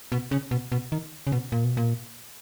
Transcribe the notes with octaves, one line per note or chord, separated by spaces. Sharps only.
B2
C#3
B2
B2
D#3
C#3
B2
A#2
B2
A#2